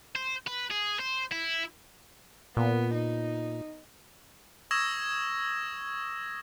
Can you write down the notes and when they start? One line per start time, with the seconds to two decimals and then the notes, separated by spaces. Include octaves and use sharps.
0.15 C5
0.47 B4
0.70 G#4
0.99 C5
1.31 E4
2.57 A#2 B3
2.94 D#4
4.71 C#6 D#6 E6 G#6 A#6 E7